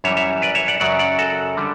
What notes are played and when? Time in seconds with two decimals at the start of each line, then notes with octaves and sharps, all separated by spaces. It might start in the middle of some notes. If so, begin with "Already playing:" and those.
0.04 F#2 E3 G3 C#5 E5
0.17 C#5 E5
0.42 B4 D5
0.55 C#5 E5
0.68 D5 F#5
0.80 F#2 C#3 F#3 D5 F#5
0.99 D5 F#5
1.19 F#4 A4
1.57 D3 G3